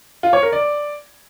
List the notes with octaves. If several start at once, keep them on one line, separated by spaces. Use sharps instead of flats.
F4
C#5
A#4
D5